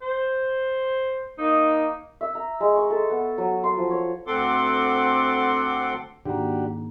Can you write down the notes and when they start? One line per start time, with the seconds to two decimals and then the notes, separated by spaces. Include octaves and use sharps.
0.02 C5
1.39 A#3 D#4
2.21 E5
2.35 A#5
2.60 G#3
2.76 C#6
2.90 A4
3.10 B3
3.38 F#3
3.64 C6
3.77 F3
3.91 C#5
4.27 D2 C4 A4 F#5 C6 D6
6.26 G#2 D#3 A#3 D4 F#4 G4